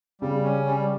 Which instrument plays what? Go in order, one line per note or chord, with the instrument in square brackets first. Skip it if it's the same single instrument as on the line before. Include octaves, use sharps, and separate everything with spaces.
[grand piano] C#3 [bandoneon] G3
[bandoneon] C#4
G3